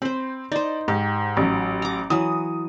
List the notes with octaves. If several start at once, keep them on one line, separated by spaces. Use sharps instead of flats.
C4 C5 B5
D#4 C5 D5
G#2 G4
A1 F#3
A#5 D6
E3 F#3 D#6